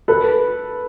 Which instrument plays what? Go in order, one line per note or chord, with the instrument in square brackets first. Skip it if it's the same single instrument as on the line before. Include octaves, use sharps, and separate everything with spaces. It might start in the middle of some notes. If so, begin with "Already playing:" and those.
[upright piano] A4 B4